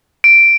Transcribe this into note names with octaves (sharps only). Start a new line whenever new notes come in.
D7